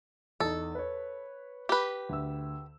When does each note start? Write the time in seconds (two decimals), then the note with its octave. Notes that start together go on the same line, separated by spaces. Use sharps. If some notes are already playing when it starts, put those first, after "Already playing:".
0.40 E2 D#4 A4
0.75 B4 C#5
1.69 G4 B4
2.09 D2 E6